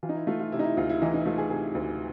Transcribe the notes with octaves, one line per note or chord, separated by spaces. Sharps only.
E3 F4
D#4
E4
A3 F4
F4
C3 E4
D#4
E4
D2 F4
E4
E3 D#4
D#4
A3 F4
G#4
C3 G#4
D2